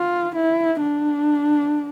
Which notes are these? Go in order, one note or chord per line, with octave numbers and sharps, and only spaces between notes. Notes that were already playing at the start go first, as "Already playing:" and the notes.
Already playing: F4
E4
D4